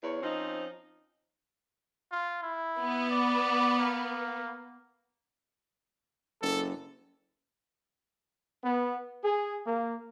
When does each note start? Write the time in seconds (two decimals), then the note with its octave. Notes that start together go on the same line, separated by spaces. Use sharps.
0.03 E2 C#5
0.22 F3 C4 C#4 D#4
2.12 F4
2.43 E4
2.79 B3
3.11 D5
3.79 A#3
6.42 F#1 A4
8.64 B3
9.24 G#4
9.67 A#3